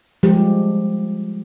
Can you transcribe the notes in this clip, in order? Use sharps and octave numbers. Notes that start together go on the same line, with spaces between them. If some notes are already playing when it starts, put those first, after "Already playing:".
F3 G3 G#3 G4